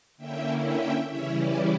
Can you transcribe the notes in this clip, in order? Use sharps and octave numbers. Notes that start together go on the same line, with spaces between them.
D3 A#3 C#4 E4 E5 G5
E5 G5
C#3 E3 G3 C#4 E4 C#5 E5
B4 D5